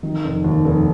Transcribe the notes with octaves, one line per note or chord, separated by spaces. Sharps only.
D#3
F1
D#2
F1